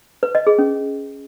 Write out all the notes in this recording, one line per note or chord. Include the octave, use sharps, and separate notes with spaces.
B4
D#5
G#4
C#4